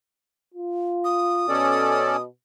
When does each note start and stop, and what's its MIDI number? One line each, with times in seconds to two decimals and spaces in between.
0.54 1.48 65
1.04 2.21 87
1.49 2.26 47
1.49 2.17 61
1.49 2.17 69
1.49 2.17 74